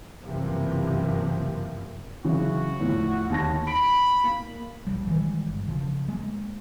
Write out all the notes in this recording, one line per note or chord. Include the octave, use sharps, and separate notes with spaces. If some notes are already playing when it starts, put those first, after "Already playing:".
F#1 G2 C3 E3 F3 A#3
C#3 E3 F#3 F#4
E2 A2 F3
D#2 A5 A#6
B5 D7
A#3
A#1 F3 G3
D#3 E3 G3 G#3
G1
C#3 F3
G#3 A#3